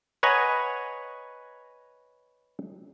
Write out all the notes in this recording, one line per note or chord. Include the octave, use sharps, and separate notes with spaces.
B4 C#5 D#5 F#5 G#5 A#5